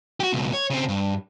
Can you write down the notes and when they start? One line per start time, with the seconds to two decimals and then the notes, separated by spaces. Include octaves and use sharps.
0.20 F#4 G4
0.33 C#2 B2
0.53 C#5
0.70 C#3 C4
0.88 G2